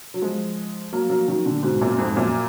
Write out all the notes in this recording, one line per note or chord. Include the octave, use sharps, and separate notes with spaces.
F#3
F3 G#3
F#3 A#3
F#3 A#3
D#3 F#3
A#2 D3
G#2 B2
F#2 A#2
F2 G#2
F#2 A#2